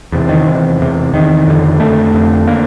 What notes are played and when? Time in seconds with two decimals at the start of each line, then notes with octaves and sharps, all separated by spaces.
0.12 E2 C3
0.29 D#3
0.47 E2 C3
0.80 E2 C3
1.14 E2 C3 D#3
1.47 F2 D3
1.80 F2 D3 A3
2.14 F2 D3
2.47 D3 A#3